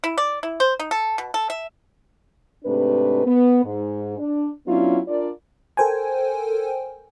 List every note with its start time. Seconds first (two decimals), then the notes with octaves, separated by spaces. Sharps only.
0.04 E4
0.18 D5
0.43 E4
0.60 C5
0.79 D#4
0.91 A4
1.18 B2
1.34 A4
1.50 E5
2.64 G#2 C3 A3 D4 B4
3.25 B3
3.63 G#2
4.18 D4
4.66 F#3 B3 C#4 D4 E4 F4
5.07 D4 F4 A#4 D5
5.77 A4 A#4 C5 G5 G#5